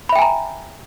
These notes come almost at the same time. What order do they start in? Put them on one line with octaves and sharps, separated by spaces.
B5 E5 G5 G#5 A#5